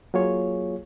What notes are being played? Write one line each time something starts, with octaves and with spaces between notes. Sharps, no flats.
F#3 A#3 F4 G#4 C#5